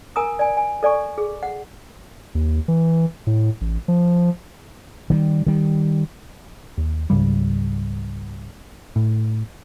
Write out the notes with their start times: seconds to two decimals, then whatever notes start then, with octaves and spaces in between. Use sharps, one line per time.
0.16 A#4 G#5 A#5 D#6
0.39 D5 G#5
0.57 G#5
0.83 A4 D5 G#5 C#6
1.18 G#4
1.43 F#5
2.35 D#2
2.68 E3
3.27 A2
3.61 A1
3.88 F3
5.10 D#3 F#3 G3
5.46 D#3 G3
6.78 D#2
7.10 C#2 G#2 C#3 G3
8.96 A2